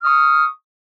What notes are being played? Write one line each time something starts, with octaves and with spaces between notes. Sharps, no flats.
C#6 D#6 F6